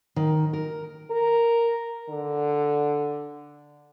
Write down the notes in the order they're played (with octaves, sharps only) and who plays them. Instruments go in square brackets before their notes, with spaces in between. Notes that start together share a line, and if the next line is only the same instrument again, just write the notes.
[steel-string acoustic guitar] D#3
A#4
[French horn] A#4
D3